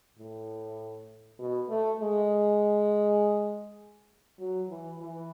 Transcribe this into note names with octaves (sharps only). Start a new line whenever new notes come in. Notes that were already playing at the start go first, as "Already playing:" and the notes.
A2
B2
A3
G#3
F#3
E3
E3